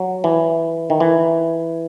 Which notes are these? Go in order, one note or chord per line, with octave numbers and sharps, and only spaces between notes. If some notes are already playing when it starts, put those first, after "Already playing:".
Already playing: F#3
E3
D#3
E3